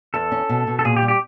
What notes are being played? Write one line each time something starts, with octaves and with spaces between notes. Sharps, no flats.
E2 A4
C#4
B2
B2
A4
A#2 G#4
G4
G3
G4